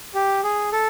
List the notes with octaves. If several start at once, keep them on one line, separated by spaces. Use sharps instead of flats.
G4
G#4
A4